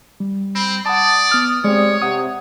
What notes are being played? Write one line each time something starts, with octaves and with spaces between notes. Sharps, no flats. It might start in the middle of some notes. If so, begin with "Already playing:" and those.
G3
C4 B5
D5 F#5 A5 D#6
B3 F6
G#3 C4 G4 C#5 D5
C3 F#5 D#6